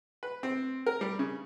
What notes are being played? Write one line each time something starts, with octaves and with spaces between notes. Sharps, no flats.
B4
C4
A#4
G3
C#3